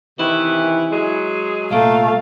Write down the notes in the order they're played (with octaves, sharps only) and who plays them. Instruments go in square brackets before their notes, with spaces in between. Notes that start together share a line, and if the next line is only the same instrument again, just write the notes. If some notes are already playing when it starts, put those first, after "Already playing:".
[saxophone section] C3 D#3 E3 [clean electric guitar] E4
[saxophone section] F#3 G#3 G#4
[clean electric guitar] C2 A#2 [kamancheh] A3 F5